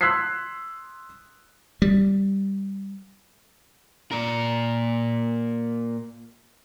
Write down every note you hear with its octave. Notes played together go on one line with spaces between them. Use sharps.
C6 E6 F#6 G#6 B6 C7
G3
A#2 A#4